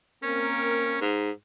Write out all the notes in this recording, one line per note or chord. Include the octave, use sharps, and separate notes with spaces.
A#3 C4 C#4 A#4
G#2